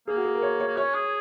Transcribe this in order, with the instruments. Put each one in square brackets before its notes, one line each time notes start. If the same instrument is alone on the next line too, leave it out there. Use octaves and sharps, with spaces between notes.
[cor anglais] A#3 [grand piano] G#4
[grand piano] F#4
G#4
A#4
C#5
C#5
[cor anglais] A#3
[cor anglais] C#4 [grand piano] C#5
[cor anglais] G#4